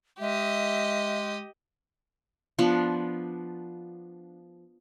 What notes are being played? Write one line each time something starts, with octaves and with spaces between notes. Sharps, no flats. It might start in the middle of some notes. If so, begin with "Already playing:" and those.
G#3 G4 D#5 E5
F3 B3 D4